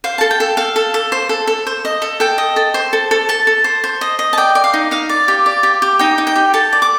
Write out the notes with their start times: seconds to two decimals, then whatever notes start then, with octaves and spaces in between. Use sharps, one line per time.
0.04 C5 F5
0.18 A4 A5
0.31 G5
0.40 A4
0.57 A4 F5
0.76 A4
0.94 A4
1.12 C5
1.29 A4
1.47 A4
1.67 C5
1.85 D#5
2.02 A4
2.20 A4 G5
2.38 D#5
2.56 A4
2.74 C5
2.93 A4
3.11 A4
3.29 A4 A5
3.47 A4
3.64 C5
3.84 C5
4.01 D#5
4.19 D#5
4.33 A5
4.38 D5 G5
4.55 D5
4.64 F5
4.74 D#4
4.91 D#4 F5
5.09 D5
5.28 G4
5.46 D5
5.63 G4
5.82 G4
5.99 D#4 G5
6.18 D#4
6.27 G5
6.36 G4
6.54 A4 A5
6.73 D5
6.82 D6